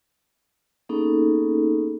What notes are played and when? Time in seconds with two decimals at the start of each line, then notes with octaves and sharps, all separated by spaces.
0.89 A#3 B3 C#4 D#4 G#4 A4